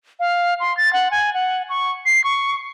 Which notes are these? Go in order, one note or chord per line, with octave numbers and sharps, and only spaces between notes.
F5
C6
A6
F#5
G#5
F#5
C#6
C7
C#6